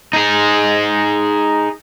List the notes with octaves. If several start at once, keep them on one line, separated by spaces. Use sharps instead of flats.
D#4 G#4